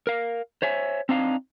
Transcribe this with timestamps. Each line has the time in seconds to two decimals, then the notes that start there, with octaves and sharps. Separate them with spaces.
0.07 A#4 F5
0.62 C5 C#5 E5 G#5
1.09 C4 D4 D#4 F5